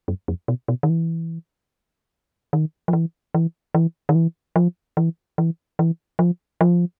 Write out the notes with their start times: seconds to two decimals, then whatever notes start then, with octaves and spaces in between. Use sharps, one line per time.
0.08 F#2
0.28 F2
0.48 B2
0.68 B2
0.83 D#3
0.90 E3
2.53 D#3
2.88 F3
2.93 E3
3.34 E3
3.74 E3
4.09 D#3
4.15 E3
4.56 F3
4.97 E3
5.38 E3
5.79 E3
6.19 F3
6.61 F3